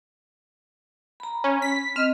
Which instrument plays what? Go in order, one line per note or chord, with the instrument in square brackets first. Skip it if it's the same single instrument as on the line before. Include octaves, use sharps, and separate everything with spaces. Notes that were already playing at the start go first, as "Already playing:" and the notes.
[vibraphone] A#5 B5
[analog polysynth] C#4
B6
[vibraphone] C4 D#5 [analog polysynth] F6